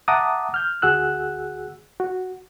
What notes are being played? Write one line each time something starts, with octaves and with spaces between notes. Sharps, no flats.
E5 F#5 A5 A#5 D6 D#6
F6 G6
D2 F#4 G#4 F#5 E6 F#6
F#4